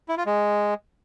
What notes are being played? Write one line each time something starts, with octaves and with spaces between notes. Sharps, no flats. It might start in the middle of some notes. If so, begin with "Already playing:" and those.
E4
F4
G#3